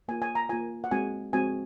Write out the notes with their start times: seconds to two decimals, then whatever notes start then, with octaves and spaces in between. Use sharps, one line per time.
0.08 A#3 F4 G#5
0.22 G#5
0.35 A#5
0.49 A#3 F4 G#5
0.84 F#5
0.91 G#3 C4 F#4 G#5
1.33 G#3 C4 F#4 G#5